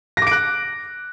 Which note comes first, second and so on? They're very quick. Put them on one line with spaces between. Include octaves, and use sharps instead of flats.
A#6 D6 D7 F#6